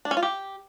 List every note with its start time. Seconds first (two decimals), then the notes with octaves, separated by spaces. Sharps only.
0.05 D4
0.11 C#4
0.17 F4
0.23 G4